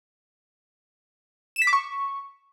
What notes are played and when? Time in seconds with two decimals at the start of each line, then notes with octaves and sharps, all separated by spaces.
1.56 E7
1.62 B6
1.67 D6
1.73 C#6